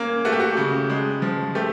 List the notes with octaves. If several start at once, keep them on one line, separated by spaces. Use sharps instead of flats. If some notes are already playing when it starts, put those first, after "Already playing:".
Already playing: A#3 C#4
A3 F#4
G4
F#4
C#3
G#3
F3
A3 G4